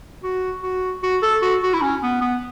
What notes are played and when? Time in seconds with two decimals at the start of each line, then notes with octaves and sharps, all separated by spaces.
0.23 F#4
0.63 F#4
1.03 F#4
1.23 A4
1.42 F#4
1.63 F#4
1.74 E4
1.82 C#4
2.03 B3
2.21 B3